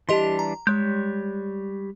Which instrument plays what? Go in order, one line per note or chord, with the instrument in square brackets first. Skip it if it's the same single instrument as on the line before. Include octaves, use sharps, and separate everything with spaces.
[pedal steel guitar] E3 G3 D4 [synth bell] G4 D#5 C6
[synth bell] A#5
[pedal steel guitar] G3 C#5 G6 [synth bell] G#3